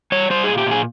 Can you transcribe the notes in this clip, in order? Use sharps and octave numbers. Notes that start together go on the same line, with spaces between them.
G3 C#5
G3 C5
A#2 G#4
G4
A#2 G#4